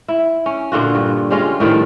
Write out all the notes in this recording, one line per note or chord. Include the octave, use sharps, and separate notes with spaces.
E4
C#4
A#2 D3 F4 F#4
G2
G3 G#3 C#4 F4
A2 D#3 F3 G3